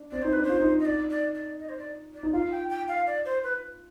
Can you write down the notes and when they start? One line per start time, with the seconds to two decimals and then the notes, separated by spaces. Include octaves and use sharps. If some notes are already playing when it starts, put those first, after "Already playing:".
Already playing: D4
0.11 C4 D5
0.22 D#4 C5
0.33 D4 B4
0.43 C5
0.49 F4
0.60 D#4
0.80 D#5
0.85 D5
1.10 D5
1.35 D5
1.60 D#5
1.69 C5
1.78 D5
2.14 D5
2.23 D#4
2.33 F4 F5
2.51 G5
2.70 G5
2.88 F5
3.07 D5
3.25 C5
3.44 B4